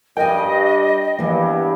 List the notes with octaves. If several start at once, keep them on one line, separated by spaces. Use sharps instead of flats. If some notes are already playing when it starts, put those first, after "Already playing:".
G2 A#4 D#5 G5 G#5
E2 G2 E3 A#3